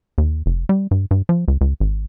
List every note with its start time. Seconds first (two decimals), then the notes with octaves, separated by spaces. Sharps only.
0.18 D#2
0.46 F1
0.69 G3
0.91 G2
1.11 G2
1.29 F3
1.48 C#2
1.61 C#2
1.80 G#1